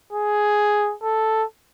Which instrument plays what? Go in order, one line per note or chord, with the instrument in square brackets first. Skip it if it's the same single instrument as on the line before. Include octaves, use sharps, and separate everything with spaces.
[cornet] G#4
A4